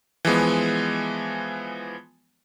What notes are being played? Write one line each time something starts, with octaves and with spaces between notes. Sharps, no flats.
E3 F3 G#3 B3